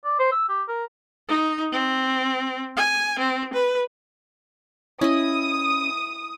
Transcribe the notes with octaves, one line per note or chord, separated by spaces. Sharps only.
D5
C5
E6
G4
A#4
D#4
C4
G#5
C4
B4
C#4 E4 D#5 D#6